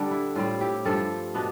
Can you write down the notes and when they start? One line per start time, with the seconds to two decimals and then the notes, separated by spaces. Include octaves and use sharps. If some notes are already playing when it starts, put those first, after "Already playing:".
Already playing: D3 G3 D4 A4
0.11 E4
0.35 A2 G3 C4 F4
0.60 E4 G4
0.85 G2 F3 A3 C4 F4 A4
1.34 B2 B3 D4